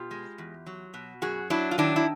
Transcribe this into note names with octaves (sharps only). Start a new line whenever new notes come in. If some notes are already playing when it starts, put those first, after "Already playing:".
Already playing: B2 F4 G4
G#3
E2
F#3
B2
F#2 F#4 G#4
F#3 D4 E4
F4
D#3 D4 E4
E4